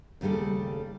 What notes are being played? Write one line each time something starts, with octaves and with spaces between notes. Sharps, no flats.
D#2 C#3 G3 A3 A4